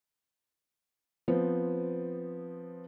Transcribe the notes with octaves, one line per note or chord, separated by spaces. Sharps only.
F3 B3 C4